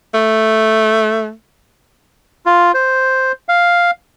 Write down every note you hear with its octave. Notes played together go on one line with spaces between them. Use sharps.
A3
F4
C5
F5